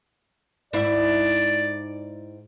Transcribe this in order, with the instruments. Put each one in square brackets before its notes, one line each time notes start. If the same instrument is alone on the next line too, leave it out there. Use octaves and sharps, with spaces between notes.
[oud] G#2 E4 [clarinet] D5